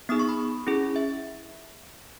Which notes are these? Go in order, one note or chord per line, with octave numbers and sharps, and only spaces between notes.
B3 D#4 G#4 D#6
C#6
B5
C#4 E4 G#4
E5